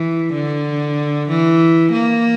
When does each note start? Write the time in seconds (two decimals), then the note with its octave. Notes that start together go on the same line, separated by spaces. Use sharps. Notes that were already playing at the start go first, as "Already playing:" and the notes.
Already playing: E3
0.33 D3
1.29 E3
1.92 A#3